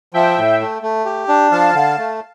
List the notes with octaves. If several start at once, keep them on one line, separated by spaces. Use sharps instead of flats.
F3 E5 G5
A2
A3
A3
G4
D4
F3 F5 A5
D3
A3